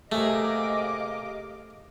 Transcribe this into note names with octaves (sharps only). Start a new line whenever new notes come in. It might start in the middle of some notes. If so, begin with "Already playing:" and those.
C3 A3 A#3 G#4 D#5 F5 D6